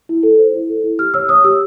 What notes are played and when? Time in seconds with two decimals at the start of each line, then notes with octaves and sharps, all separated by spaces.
0.09 E4
0.23 A4
0.39 C5
0.53 E4
0.69 A4
0.84 E4
0.99 G4 F6
1.14 C#5 E6
1.29 C#5 D#6
1.44 G4 E6